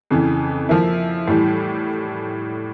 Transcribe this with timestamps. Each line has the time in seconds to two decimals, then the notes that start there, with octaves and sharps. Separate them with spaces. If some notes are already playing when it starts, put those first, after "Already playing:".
0.11 F2 C#3 E3
0.69 F3 A#3 E4
1.28 A2 E3 G3